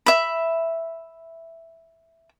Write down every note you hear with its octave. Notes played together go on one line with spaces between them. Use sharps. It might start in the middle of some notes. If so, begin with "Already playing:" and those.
E5 B5